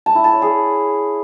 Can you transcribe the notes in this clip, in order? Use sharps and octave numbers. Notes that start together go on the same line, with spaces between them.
A5
E4
A5
C#5
G#4